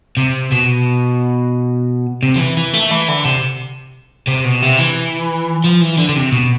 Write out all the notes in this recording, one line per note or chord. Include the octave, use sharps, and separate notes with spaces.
C3
B2
C3
F3
E3
E3
A3
E3
D3
C3
C3
B2
C3
E3
F3
E3
D3
D3
C3
B2